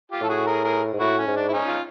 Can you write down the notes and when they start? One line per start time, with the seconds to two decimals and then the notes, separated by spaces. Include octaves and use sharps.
0.12 F4 G4
0.21 A2 A4
0.29 F#4 G#4
0.47 G#4 A#4
0.64 G#4 A#4
0.93 G#2
1.00 A2 E4 F#4
1.18 C#4
1.27 G#2
1.36 D4
1.49 E4
1.53 C#4 D#4
1.68 F4